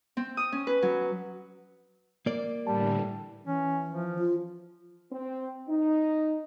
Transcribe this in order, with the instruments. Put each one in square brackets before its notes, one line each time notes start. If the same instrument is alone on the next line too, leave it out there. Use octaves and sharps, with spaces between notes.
[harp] C4
D#6
C#4
B4
F#3
[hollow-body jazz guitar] A#3 D5
[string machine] A2 D3 E3 [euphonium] G3 [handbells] A5
[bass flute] E3 [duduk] C#4
[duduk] F3
[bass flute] F4
[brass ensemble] C4
D#4